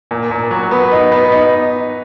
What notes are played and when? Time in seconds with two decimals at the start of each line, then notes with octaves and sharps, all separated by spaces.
0.11 A#2
0.31 A#2
0.51 F#3
0.71 B3
0.92 D#4
1.12 B3
1.32 D#4